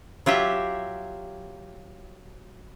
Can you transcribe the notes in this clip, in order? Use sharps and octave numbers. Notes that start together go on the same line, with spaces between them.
F#3 F4 G4 E5